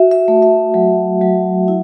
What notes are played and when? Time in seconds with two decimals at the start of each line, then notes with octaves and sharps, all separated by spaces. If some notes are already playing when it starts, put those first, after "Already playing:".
Already playing: F#4 E5
0.11 E5
0.28 A3
0.42 E5
0.74 F#3
1.22 F#3
1.68 E4